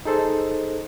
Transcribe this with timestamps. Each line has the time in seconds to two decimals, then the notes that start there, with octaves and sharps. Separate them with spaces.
0.05 D#4 G#4 A4 C5 D#5